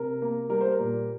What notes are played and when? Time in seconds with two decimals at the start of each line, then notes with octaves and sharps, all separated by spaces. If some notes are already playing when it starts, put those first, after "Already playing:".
Already playing: C3 A#4
0.22 A#3
0.49 G3 A#4
0.61 C5
0.72 A#4
0.79 A#2